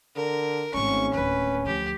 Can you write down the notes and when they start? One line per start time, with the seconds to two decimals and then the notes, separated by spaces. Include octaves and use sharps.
0.16 D3 A#4
0.74 G#1 A3 C#4 C#6
1.14 D1 D#2 B4
1.66 D2 F3 G4